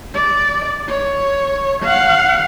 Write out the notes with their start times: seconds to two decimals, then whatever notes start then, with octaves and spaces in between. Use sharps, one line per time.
0.14 D5
0.88 C#5
1.83 F5 F#5